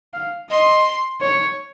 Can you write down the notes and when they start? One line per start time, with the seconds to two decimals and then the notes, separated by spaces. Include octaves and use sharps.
0.14 F5
0.50 D#5 C6
1.21 C#5